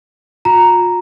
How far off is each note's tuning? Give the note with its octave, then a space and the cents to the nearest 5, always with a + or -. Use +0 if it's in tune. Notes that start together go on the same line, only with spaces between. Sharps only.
F4 +40 A#5 +0